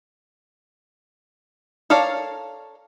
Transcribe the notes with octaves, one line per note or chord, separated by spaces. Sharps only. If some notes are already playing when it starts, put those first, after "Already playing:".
A4 A#4 C#5 D5 F5